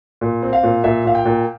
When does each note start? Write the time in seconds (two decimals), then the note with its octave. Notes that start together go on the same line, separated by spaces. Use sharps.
0.21 A#2
0.43 C4
0.53 F5
0.63 A#2
0.84 A#2 E5
1.05 A#2 F5
1.15 G5
1.25 A#2